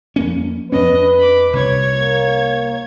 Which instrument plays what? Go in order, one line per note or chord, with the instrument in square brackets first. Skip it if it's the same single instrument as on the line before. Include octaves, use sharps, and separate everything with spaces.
[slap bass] F2 A#3 C#4
[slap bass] F2 B3 C#4 [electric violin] D4 D#5 [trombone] B4
[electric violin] B5 D6
[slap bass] C2 [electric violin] C#5 G#6
[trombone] A#3